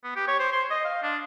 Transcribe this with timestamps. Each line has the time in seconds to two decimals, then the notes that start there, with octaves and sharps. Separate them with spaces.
0.04 B3
0.16 G4
0.28 C#5
0.39 C5
0.52 C6
0.70 D#5
0.85 F5
1.03 D4